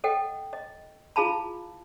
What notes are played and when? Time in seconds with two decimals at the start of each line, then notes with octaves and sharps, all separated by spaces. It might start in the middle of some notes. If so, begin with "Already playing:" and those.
0.04 A4 D#5 F#5 G5
0.53 D#5
1.16 E4 F4 G#4 F5 A5 B5